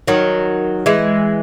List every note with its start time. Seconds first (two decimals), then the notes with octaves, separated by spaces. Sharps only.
0.08 D#3 F#3
0.86 E3 G#3